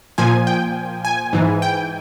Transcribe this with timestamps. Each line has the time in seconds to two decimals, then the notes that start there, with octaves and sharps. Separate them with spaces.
0.18 A#2 F3 G#5
0.47 G5
1.05 G#5
1.33 G#2 E3
1.62 G5